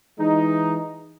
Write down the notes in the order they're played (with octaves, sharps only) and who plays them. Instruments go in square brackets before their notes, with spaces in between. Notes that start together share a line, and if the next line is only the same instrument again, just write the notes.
[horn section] E3 G#3 D#4